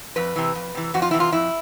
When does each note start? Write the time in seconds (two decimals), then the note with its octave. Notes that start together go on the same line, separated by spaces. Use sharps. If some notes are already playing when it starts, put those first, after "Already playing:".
0.16 F2 B4
0.36 C3 E3
0.55 F2
0.75 C3 E3
0.94 F2 F#4
1.02 F4
1.11 C3 E3 E4
1.20 F4
1.32 F2 E4